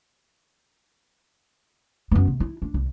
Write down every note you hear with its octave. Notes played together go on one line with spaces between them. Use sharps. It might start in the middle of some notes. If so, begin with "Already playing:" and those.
F#2 B3
C3
E4
D4
C2